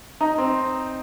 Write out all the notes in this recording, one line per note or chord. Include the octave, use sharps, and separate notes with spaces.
D#4
C4